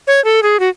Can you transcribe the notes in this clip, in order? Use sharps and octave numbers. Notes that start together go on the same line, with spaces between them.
C#5
A4
G#4
F#4